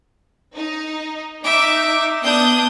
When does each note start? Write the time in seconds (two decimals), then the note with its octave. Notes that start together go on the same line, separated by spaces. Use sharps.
0.56 D#4
1.44 D#4 E5 D6
2.23 B3 D4 D#6 G6